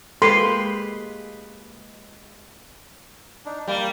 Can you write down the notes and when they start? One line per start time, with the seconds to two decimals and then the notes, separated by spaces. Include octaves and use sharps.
0.22 G#3 A#3 F4 G4 A4 B4 C6
3.45 D4 D#4
3.68 G3 A#3 G5